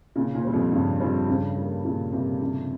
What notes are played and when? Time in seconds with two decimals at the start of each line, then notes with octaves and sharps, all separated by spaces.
0.16 A#2 C#3
0.35 A#2
0.44 G3 C4
0.54 F2
0.72 G2 C#3
1.00 F2 G3 C4
1.28 G2 C#3
1.57 G3 A#3
1.85 A#2 C#3
2.13 C3 G3 A#3
2.41 C#3